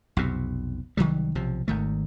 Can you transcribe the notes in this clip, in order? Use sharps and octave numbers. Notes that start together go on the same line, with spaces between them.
B1 F2 C3
C2 D#3 F#3 G3
B1 C3 F3
G#1 D#3 A3